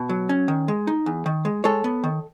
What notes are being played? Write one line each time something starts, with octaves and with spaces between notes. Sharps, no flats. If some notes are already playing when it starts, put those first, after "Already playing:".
Already playing: B2
F#3
C#4
D#3
G#3
D#4
E2
D#3
G#3
G#3 A4 C#5
B3
D#3